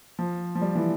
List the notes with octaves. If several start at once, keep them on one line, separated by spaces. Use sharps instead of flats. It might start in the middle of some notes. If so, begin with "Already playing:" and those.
F3
F3
G3
E3